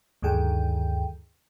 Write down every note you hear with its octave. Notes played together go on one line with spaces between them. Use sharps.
D2 G2 D#3 G#4 G5